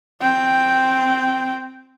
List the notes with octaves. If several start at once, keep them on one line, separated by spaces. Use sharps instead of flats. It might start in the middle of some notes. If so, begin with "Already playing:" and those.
C4 G5